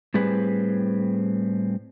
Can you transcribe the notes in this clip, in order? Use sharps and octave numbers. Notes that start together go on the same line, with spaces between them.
A2 G3 C4 G#4 B4